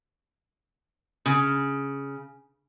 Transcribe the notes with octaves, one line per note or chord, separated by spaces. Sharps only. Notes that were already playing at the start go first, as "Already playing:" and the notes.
C#3